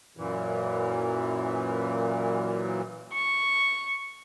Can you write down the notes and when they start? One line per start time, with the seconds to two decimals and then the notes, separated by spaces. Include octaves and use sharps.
0.17 F#2 A#2 E3
3.12 C#6